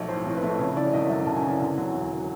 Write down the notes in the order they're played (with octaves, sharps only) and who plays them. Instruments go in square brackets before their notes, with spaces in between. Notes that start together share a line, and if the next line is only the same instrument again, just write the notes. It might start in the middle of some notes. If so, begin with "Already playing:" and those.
Already playing: [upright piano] B1 F3 A3 C#5
A2 C5
F3
B4
A3
C#3 C#5
E3 D5
G#1 D#5
F#2 E5
C#3 A5
G#5
E3
D3
F#3
E1